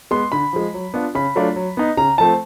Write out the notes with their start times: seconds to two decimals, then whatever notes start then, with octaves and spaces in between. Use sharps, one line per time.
0.11 G#3 B3 C6
0.32 D3 B5
0.53 F3 G#3
0.74 F#3
0.94 B3 D4 F4
1.15 C#3 B5
1.35 F#3 A3 D4 F4
1.56 F#3
1.77 B3 D#4
1.97 C#3 A#5
2.18 F3 A3 C4 A5